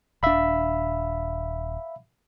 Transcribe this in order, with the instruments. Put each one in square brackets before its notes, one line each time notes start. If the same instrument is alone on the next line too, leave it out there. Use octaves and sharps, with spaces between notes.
[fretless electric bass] D#1 D4 [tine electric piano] E5 F5 B5